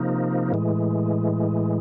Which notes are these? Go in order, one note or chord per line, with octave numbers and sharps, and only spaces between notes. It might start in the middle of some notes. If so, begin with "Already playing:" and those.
Already playing: C3 F3 A#3 D#4
A2 E3 G#3